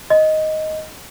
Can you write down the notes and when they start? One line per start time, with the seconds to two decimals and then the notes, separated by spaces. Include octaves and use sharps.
0.10 D#5